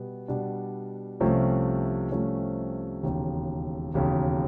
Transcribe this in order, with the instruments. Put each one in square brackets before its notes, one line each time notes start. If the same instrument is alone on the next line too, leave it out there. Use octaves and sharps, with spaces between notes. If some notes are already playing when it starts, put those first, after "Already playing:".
Already playing: [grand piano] B2 G3 B3
B2 G3 B3 D4
C2 C3 F3 A3 C#4
C2 C3 F3 A3 C#4
E1 D#2 C#3
E1 D#2 C#3